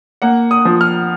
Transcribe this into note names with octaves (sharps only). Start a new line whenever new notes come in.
A#3 F#5
D#6
F3
F6